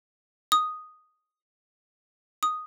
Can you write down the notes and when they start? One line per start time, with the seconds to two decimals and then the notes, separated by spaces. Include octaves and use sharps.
0.52 D#6
2.43 D#6